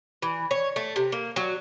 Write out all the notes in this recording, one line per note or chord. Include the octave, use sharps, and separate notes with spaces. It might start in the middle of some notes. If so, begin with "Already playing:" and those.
E3
C#5
A3
C3
A#3
F#3